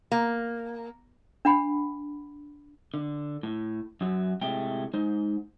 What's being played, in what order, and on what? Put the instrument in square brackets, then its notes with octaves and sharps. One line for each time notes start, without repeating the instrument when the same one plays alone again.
[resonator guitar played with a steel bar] A#3
[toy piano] D4 F#5 B5
[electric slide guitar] D3
A2
F#2 F#3
A2 C3 G#3 A3 G5
G#3 D#4 C5